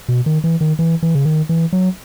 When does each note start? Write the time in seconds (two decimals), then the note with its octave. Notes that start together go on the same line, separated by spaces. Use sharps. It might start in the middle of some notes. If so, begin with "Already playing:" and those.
0.09 B2
0.26 D#3
0.44 E3
0.61 D#3
0.79 E3
1.03 E3
1.15 C#3
1.25 D#3
1.49 E3
1.73 F#3